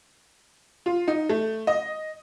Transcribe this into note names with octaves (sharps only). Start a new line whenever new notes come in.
F4
D#4
A3
D#5